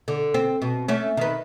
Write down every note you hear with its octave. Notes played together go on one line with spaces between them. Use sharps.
D3
C4
B2
A3 C#4
D#3 B4